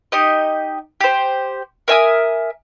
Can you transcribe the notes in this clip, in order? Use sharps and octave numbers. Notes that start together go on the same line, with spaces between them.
D#4 G4 D#5
G4 C5
A#4 E5 G#5 D#6